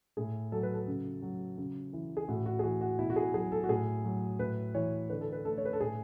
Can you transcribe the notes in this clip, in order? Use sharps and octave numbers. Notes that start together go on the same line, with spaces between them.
A2 G#4
F#3 A4
B4
A4
C#3
F#3
C#3
E3
G#4
A2 F#4
F#4
G#4
E3 F#4
F#4
B2 E4
F#4
G#4
F#3 G#4
A4
F#4
A2 G#4
F#3
A2 B4
E3 C#5
D3 B4
A4
B4
A3 A4
C#5
B4
A4
A2 G#4